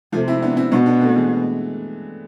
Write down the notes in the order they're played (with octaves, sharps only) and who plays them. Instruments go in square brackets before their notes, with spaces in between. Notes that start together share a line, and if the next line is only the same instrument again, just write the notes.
[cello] C3 [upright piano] F3 A3
[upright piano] C4 E4
B3 D4
C4 E4
[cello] B2 [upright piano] B3 D4
[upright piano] B3 D4
A3 C4
E3 G#3